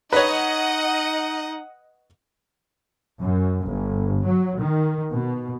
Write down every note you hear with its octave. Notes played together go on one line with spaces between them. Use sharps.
D#4 B4 C#5 D#5 F#5
F#2
G1
F#3
D#3
B2